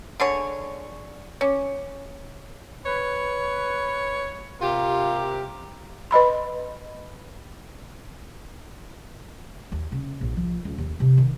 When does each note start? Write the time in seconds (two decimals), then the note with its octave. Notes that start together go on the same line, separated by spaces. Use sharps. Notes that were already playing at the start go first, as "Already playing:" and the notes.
0.20 D3 G#4 C#5
1.41 C#4 C#5 D6
2.86 B4 C#5
4.61 C3 F4 G4 A#4
6.11 B4 D#5 B5 C6
9.72 D#2
9.92 C#3
10.21 A#1
10.36 F3
10.65 C#2
10.78 D#2
11.00 C3
11.18 D#3